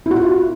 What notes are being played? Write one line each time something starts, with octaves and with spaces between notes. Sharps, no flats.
E4
F#4
F4